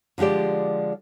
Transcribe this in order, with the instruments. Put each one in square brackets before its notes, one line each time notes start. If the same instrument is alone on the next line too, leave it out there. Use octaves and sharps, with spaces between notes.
[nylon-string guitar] D3 F3 G#3 G4 D5